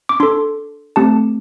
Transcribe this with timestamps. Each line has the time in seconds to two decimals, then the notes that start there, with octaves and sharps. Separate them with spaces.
0.09 D6
0.20 D4 A4 C6
0.96 A3 C4 G4 A5